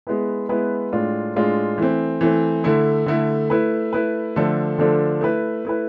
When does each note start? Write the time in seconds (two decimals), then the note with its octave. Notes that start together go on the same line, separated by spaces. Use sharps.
0.07 G#3 B3 E4 B4
0.49 G#3 B3 E4 B4
0.92 A2 G#3 D4 F4
1.35 A2 G#3 D4 F4
1.78 E3 A3 C4
2.21 E3 A3 C4
2.64 D3 A3 E4
3.06 D3 A3 E4
3.50 A3 E4 B4
3.93 A3 E4 B4
4.36 D3 F3 A3 D4 A4
4.78 D3 F3 A3 D4 A4
5.21 A3 E4 B4
5.65 A3 E4 B4